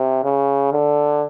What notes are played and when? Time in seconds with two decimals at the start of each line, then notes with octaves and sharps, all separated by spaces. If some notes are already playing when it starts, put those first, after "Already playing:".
Already playing: C3
0.24 C#3
0.73 D3